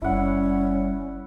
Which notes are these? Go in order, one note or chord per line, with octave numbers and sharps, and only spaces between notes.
F#1 G3 C#4 E4 F#5